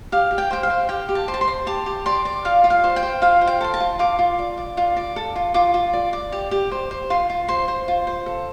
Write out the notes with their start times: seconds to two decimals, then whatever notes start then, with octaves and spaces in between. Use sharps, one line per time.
0.12 G4 F5
0.31 G4
0.38 G5
0.51 C5 G5
0.63 F5
0.70 C5
0.89 G4 G5
1.09 G4
1.15 A5
1.28 C5
1.34 A5
1.41 C6
1.48 C5
1.67 G4 A5
1.86 G4
2.06 D5 C6
2.25 D5
2.45 F4 F5
2.64 F4
2.70 F5
2.84 C5
2.96 G5
3.03 C5
3.22 F4 F5
3.41 C5
3.47 G5
3.61 A4 C6
3.74 A5
3.80 F4
3.99 F4 D6
4.19 F4
4.39 D5
4.58 D5
4.77 F4
4.97 D5
5.16 A4
5.36 F4
5.54 F4 D6
5.74 F4
5.93 D5
6.13 D5
6.32 G4
6.51 G4
6.71 C5
6.91 C5
7.10 F4 C6
7.30 F4
7.48 C5 C6
7.68 C5
7.88 F4
8.07 C5
8.26 A4